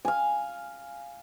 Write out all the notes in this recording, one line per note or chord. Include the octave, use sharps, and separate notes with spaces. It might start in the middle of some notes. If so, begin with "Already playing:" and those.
F5 G#5